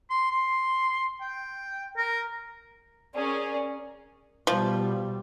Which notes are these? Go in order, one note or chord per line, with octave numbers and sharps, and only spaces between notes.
C6
C6
G5
A#4
C#4 G#4 A#4 D5
B2 F3 G3